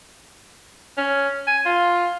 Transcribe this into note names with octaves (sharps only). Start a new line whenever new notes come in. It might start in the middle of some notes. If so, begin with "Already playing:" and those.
C#4
G#5
F4